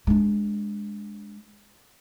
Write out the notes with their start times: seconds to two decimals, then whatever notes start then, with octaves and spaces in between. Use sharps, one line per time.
0.07 G#3 D4